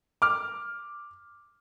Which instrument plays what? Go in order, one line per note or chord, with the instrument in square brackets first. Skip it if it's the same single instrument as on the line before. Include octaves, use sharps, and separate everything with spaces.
[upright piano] D6 F6